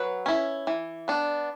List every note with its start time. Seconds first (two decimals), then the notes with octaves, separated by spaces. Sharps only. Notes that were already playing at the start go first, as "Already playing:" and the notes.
Already playing: F#3 B4
0.26 C#4 E4
0.67 E3
1.08 B3 D4